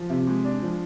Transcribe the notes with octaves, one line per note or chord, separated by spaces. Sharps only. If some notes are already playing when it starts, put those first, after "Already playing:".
Already playing: F3
C3
G#3
D4
F3